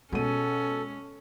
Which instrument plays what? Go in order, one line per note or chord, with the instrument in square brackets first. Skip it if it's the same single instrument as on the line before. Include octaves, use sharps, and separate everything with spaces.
[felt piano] B2 D#7 [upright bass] G#3 [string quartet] C#4 [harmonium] A4